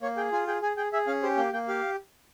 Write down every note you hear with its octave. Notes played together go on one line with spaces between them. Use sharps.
A#3 C#5
G#4 G5
F4 G#5
G#4 G5
G#4 G#5
G#4 G5
G#4 E5
C#4 F5
G4 C5
A#3 G5
A#3 G5
G4 F5